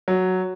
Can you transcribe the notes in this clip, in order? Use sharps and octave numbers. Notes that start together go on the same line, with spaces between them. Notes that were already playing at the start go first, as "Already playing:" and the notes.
F#3